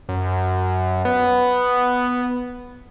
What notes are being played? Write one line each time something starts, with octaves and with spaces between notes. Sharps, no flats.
F#2
B3